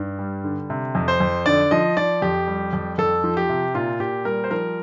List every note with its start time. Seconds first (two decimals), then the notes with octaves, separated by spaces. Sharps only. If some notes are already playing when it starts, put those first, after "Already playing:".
Already playing: G2
0.19 G3
0.44 D3
0.70 C3
0.95 F2
1.08 C5
1.20 F2
1.46 D3 D5
1.71 F3 D#5
1.97 F3 D5
2.22 F2 G4
2.47 G3
2.73 F2
2.98 F2 A4
3.24 F3
3.37 G4
3.49 C3
3.74 A#2 F4
4.00 A#2 G4
4.25 G3 A#4
4.44 C5
4.51 F3 A#4